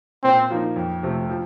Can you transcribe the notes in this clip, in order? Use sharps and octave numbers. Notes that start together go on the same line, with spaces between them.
A#2 C4
F3 A#3 D#4
F2
C3 F3 A3 C4
F3